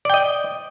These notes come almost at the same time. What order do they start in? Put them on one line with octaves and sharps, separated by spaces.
D5 G5 D#5